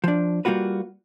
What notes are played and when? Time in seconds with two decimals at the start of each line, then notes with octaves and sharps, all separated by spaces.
0.04 F3 D4
0.45 G3 A#3 F4 F#4 B4